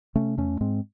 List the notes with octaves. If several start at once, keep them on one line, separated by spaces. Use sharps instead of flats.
C3 A3 C#4
E2 A3 C#4
G#2 G#3 C4